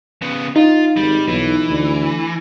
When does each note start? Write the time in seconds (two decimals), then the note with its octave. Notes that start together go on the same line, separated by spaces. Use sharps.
0.22 C#3 B3
0.56 D#4 F4
0.97 G#1 G3
1.28 B1 E3
1.69 D2